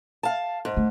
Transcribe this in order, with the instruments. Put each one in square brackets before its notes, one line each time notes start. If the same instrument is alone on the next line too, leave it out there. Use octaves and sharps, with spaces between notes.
[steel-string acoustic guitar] F5 A5
G#2
[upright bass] A3